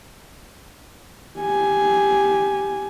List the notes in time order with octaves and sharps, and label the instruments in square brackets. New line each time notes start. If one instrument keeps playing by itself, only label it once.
[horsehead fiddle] G4 G#5